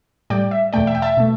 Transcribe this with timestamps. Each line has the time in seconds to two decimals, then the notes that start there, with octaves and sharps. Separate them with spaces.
0.30 A2 G3 D5 G5
0.51 E5
0.73 E2 B2 A3 D5 G5
0.87 E5
0.95 G5
1.02 E5 A5
1.17 B2 A3